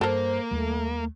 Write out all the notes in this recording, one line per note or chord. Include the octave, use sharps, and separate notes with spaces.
G2 A#3 A4 A#4 C5
D#2 G3 A3